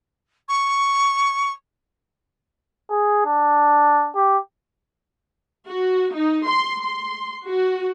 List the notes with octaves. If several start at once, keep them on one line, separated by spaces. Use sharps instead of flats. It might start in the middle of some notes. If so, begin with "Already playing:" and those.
C#6
G#4
D4
G4
F#4
D#4
C6
C6
F#4